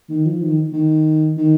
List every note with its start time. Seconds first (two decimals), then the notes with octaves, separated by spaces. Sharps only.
0.09 D#3
0.25 F3
0.42 D#3
0.72 D#3
1.37 D#3